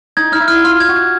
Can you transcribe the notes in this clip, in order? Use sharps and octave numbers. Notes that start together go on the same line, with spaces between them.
D#4 G#6
D#4 F6
E4
F6
F4 F6
G#6
F#4
G#6